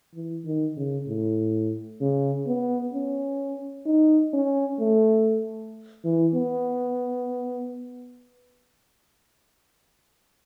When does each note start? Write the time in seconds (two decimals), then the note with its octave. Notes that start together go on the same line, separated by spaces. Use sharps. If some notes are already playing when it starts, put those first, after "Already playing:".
0.14 E3
0.45 D#3
0.77 C#3
1.08 A2
2.01 C#3
2.47 B3
2.94 C#4
3.86 D#4
4.33 C#4
4.80 A3
6.05 E3
6.34 B3